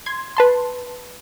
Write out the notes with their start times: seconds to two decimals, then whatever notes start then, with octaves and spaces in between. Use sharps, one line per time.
0.06 C6 G#6
0.37 B4 A5 C6